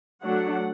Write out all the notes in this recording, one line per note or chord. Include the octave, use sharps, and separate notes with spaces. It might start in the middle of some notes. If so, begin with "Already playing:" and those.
F#3 A3 D4 F#5